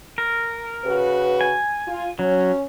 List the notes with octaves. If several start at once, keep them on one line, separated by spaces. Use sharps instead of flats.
A#4
C#3 F#4 B4
G#5
F4
F#3 C#4